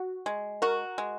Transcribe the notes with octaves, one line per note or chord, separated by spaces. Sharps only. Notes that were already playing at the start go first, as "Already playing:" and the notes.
Already playing: F#4
G#3
F#4 A#4
G#3